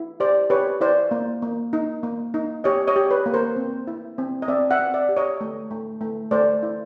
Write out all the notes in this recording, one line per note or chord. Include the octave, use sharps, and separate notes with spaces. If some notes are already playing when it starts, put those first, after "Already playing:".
Already playing: E4
G4 C5 D5
G4 B4 C#5
E4 C5 D5
A#3
A#3
D#4
A#3
D#4
G4 C#5 D#5
C#5 D#5
G4
B4 C#5
A#3
A#4 C5
C4
E4
C4
D#5
C4 D5 E5
E5 F#5
C4
D5 E5
G4
C#5 D#5
A3
A3
A3
A3 C5 D5
E4